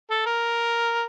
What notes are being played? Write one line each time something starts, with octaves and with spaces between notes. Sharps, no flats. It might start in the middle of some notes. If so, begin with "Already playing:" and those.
A4
A#4